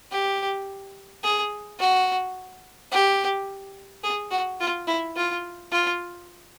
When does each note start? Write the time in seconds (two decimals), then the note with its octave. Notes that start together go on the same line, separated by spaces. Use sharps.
0.11 G4
1.23 G#4
1.80 F#4
2.92 G4
4.03 G#4
4.31 F#4
4.60 F4
4.87 E4
5.16 F4
5.72 F4